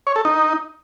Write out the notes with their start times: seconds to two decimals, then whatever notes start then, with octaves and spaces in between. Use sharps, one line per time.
0.07 C#5
0.16 A4
0.25 D#4